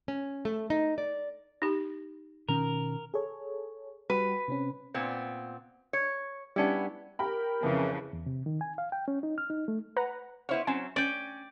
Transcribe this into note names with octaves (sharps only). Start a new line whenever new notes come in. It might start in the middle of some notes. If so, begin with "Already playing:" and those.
C#4
A3
D#4
D5
D#4 G4
B2 D#3 C#4 A#4
G#4 A4 C#5
G3 F#4 G4 B4
C3 C4 C#4
A#2 B3 C4
C#5
G3 B3 C#4 D4 E4
G4 A#4 G5 B5
F2 C#3 E3
E2
C3
D#3
G#5
F5
G5
C#4
D#4
F6
D#4
A3
B4 F#5 A#5
B3 E4 C5 C#5 F5
F#3 C4 C#4 G#5
C#4 D5 G5